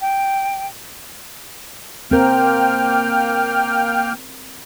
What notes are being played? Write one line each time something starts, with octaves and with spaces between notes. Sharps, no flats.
G5
A#3 C4 A#4 G5 F6